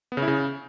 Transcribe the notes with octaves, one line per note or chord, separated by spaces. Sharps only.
B3
C#3
E4
C#3